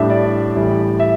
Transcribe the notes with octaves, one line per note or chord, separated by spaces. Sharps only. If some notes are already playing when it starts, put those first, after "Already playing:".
Already playing: A2 G3 D4 E5
D5
A1 A2 G3 E4
E5